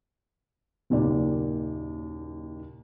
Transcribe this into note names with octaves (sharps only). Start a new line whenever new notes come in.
F#1 D#2 A#2 D5